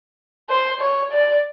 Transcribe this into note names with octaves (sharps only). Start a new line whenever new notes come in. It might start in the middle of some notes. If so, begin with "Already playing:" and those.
C5
C#5
D5